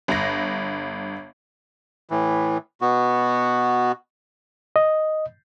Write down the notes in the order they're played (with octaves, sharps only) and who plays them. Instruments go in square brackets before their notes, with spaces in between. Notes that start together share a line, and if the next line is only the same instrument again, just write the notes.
[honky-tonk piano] G1 A#6
[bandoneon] A2 E3
B2 B3 F#4
[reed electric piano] D#5